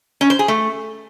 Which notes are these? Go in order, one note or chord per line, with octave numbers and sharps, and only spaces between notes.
C#4
C5
G#4
A3